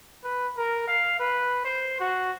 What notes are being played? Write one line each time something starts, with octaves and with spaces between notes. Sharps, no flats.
B4
A#4
F5
B4
C5
F#4